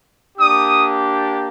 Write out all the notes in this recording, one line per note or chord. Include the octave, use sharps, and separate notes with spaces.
A#3 D4 G4 D#6